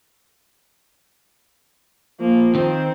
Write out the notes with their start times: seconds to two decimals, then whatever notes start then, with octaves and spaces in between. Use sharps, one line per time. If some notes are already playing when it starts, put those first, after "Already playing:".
2.20 F3 A#3
2.55 D#3 C4